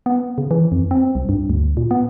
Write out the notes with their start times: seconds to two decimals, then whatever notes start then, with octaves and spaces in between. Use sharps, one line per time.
0.06 B3
0.38 C#3
0.51 E3
0.72 F2
0.91 C4
1.15 C2
1.29 G2
1.50 D2
1.77 A#2
1.91 B3